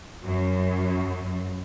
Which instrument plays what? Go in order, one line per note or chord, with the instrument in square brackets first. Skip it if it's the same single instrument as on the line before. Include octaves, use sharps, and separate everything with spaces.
[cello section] F#2